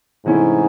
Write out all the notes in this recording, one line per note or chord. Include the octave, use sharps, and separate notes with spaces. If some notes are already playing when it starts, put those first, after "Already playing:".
G#2 C3 E3 A3 C#4 E4